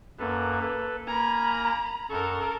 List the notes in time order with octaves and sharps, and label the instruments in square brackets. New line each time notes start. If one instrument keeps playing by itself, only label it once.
[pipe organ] F#2 A4 B4 [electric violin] A#3
[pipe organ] A4 B4
[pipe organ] A#3 A#4 G#5 [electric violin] A#5 B5
[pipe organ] F#2 C#6 [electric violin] A4 A#4